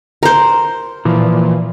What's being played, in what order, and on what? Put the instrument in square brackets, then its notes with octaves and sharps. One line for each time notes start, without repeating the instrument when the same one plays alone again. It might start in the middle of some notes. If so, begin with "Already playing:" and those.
[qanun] A#4 C5
[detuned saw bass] A#2 [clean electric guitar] E3 F3